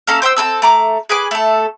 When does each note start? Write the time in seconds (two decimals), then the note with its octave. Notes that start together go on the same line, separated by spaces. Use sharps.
0.07 A#3 C#4 A4 F5
0.22 C5 G5 B5 E6
0.36 C4 F4 A4 E6
0.62 A3 A#5 D6
1.09 G#4 B4 G#5 D6
1.31 A3 A4